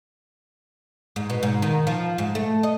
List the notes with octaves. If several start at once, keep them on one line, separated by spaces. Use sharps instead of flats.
G#2
B2
G#2
D#3
F3
G#2
A3
D#5